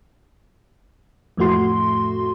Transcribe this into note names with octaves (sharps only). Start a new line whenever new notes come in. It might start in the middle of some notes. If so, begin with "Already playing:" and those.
F2 A2 A3 F#4 C6